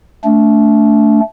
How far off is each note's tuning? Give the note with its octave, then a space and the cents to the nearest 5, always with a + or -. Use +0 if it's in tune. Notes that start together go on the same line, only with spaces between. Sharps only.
A3 +0 D4 -30